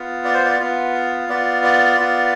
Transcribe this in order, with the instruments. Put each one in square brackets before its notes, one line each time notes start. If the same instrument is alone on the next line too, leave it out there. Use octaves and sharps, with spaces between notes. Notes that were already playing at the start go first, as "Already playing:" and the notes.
Already playing: [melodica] B3 F4
D5
C5
D5
B3 F4
B3 F4 D5
D5
B3 F4